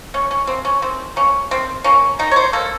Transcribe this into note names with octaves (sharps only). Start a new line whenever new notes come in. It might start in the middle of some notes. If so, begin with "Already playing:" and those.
D#3 C#4
C#4
A#3 C4
C#4
D#3 C4
A#3 C#4
D#3 C4
A#3 C#4
D#3 D#4
C#5
C5
A#3 A4